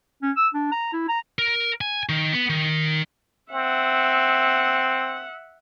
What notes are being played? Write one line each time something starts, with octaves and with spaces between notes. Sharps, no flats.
C#4
E6
D4
A#5
E4
A#5
A#4
G#5
D#3
B3
D#3
C4 E5 F#5